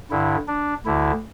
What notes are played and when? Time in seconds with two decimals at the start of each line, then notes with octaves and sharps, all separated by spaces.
0.11 G2 D3 E4
0.48 D4
0.85 D2 D3 E4